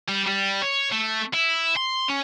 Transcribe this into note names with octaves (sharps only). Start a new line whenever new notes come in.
G3
G3
C#5
A3
E4
C6
C#4